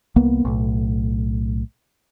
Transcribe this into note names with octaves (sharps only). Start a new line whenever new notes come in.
C2 A#3 B3
B1 A2